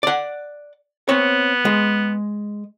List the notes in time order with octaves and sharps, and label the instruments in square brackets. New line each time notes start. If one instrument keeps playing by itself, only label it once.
[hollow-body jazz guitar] D5 F#5
[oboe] B3 [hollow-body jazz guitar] C4 C#5
[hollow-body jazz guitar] G#3